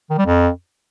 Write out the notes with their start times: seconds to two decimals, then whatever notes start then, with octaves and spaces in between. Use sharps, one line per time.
0.10 D#3
0.18 G3
0.26 F2